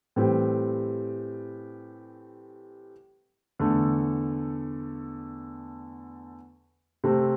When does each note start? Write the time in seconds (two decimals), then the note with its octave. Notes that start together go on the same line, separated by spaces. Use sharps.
0.16 A2 E3 G3 C4 G4
3.59 E2 D3 A3
7.04 C3 A3 C4